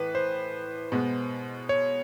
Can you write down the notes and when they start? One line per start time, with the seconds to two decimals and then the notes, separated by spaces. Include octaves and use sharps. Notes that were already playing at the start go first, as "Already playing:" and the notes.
Already playing: A2 E3 B4
0.15 C5
0.92 B2 G#3 B3
1.69 C#5